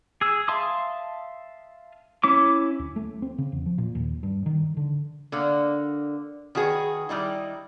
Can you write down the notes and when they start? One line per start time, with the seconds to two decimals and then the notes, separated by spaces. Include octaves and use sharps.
0.21 G#4 E6
0.48 E5 F5 A5 C6 D#6
2.24 C#4 E4 D6
2.79 D2
2.96 A3
3.22 C4
3.38 C#3
3.52 E2
3.66 F3
3.78 A#2
3.95 D#2
4.23 G2
4.46 D#3
4.77 D3
5.32 D3 A#3
6.55 D#3 F#4 G#4 B4
7.09 D#3 G3 D#4 E4